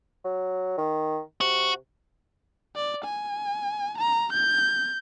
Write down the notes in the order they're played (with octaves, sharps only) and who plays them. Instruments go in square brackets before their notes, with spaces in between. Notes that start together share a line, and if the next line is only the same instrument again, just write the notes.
[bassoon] F#3
D#3
[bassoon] C3 [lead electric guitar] F#4
[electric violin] D5
G#5
A#5
G6